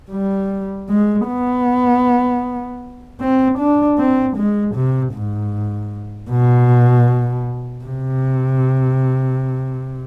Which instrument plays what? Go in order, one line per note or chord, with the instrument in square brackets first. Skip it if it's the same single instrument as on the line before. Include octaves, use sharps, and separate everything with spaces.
[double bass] G3
G#3
B3
C4
D4
C4
G#3
C3
G#2
B2
C3